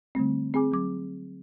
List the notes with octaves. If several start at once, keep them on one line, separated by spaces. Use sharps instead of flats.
D3 G3 A3 C4
C4 G#4 G#5 D6
F#3 D6